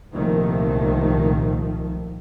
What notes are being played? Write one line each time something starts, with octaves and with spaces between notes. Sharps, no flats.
C2 A#2 D#3 F3 A3